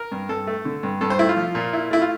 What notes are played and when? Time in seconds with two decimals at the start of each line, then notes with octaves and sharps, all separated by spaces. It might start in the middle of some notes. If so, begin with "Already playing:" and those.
Already playing: A#4
0.12 G2
0.29 G2 A4
0.47 A3
0.65 D3
0.83 G2
1.01 G2 A4
1.10 C5
1.19 A3 E4
1.29 F4
1.37 F3
1.55 A#2
1.73 E4
1.91 A3 E4
2.02 F4